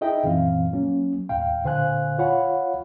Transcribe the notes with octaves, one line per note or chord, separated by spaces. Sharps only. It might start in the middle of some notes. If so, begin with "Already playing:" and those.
D#4 E4 G#4 D#5 E5 G5
F#2 A#2 E3 C4 F5
F#3 A#3 C#4
D#2 A2 F5 G5
A#2 D3 C5 F5 G#5 F#6
F4 C#5 F5 F#5 B5